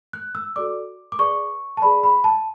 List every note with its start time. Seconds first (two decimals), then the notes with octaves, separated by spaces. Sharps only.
0.13 F#6
0.35 E6
0.56 F#4 A4 D5 D6
1.12 D6
1.19 G#4 B4 D5 C#6
1.77 A5
1.82 G#4 B4 D5 B5
2.03 B5
2.24 A5